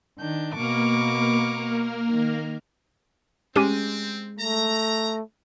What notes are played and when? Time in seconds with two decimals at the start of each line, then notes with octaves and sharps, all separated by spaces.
0.19 D#3 D4 G6
0.55 B2 A#3 A#4 C#6 D6
2.09 D#3
3.56 G#3 C4 C#4 G4 D#7
4.39 A3 A#5